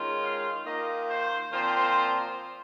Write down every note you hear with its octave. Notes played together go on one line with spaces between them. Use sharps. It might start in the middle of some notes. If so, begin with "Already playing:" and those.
Already playing: D#3 G#3 C#4 F4
F5
D#3 A#3 F4 D#5
C5
A#2 F3 C4 F4 C5